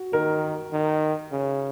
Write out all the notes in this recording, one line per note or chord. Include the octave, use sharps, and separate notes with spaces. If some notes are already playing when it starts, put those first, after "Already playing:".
Already playing: F#4
D#3 A#4
D#3
C#3